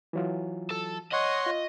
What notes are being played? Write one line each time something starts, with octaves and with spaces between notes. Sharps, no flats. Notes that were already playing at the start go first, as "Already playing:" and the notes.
E3 F#3 F4
A4
C#5 D#5 F#5 C6
F4